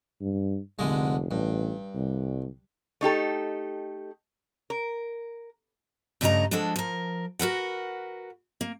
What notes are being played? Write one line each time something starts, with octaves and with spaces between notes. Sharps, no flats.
G2
F1 C2 D3 G#3
A1 G2
C2
A3 D#4 G4 A4
A#4
G2 C#3 A3 A#4 D#5 A#5
F3 G#3 D4 F#4 A4
F3 A#4
F#4 A#4 B4 F#5
A#3